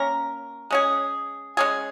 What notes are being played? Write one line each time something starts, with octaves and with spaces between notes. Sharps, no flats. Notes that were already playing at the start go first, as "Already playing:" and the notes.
Already playing: A#3 C#4 A#4
G#3 C#4 G#4
G#3 C#4 G#4